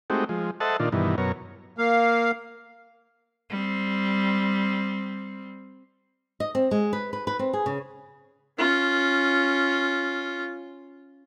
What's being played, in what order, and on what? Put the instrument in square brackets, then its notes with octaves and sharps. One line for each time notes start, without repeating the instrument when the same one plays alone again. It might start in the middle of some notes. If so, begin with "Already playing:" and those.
[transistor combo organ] G#3 A3 C4 D#4 F#4 G4
F3 G#3
A4 C5 D#5 E5 F#5 A5
A#2 D#3 D4 F4
G2 B2 D#3 E3
F#2 B2 A#4 C#5
[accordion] A#3 F5
[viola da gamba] G3 C4
[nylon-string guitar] D#5
C4
G#3
B4
B4
B4
C4
G#4
C#3
[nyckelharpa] C#4 F4